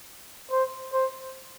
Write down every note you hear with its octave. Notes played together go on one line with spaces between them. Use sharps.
C5
C5